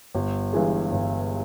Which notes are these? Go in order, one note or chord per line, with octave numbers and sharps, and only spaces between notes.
G1
G2 E3 G#3
G1